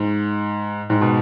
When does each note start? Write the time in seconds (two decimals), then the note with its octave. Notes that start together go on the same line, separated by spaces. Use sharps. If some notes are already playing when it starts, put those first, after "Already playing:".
Already playing: G#2
0.90 G#2
1.01 B2